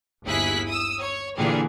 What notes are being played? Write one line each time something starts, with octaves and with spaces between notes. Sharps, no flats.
G1 D#2 E4 G#4 F#6 B6
D#6 E6
C#5
A#2 D3 E3 G4 G#4